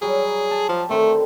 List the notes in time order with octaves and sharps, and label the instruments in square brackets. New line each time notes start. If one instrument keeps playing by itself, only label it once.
[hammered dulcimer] F#3 G3 [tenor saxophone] G#4
[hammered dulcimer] A5
[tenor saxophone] F3 [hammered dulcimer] G4
[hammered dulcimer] D3 D#3 C4 [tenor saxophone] A3